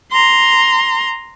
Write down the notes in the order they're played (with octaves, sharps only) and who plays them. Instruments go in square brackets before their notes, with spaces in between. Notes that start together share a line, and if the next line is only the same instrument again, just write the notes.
[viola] A#5 C6